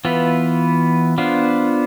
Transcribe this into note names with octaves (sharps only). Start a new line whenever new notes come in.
E3 B3 F4 B4
B3 D4 F4 C5